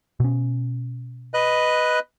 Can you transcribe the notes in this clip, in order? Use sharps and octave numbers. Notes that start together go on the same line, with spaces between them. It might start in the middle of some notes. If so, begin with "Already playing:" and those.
B2 C#4
B4 D#5 F#6